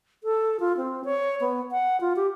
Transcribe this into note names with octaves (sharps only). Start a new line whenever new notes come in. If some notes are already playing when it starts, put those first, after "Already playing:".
A4
F4
C4
C#5
B3
F#5
F4
G4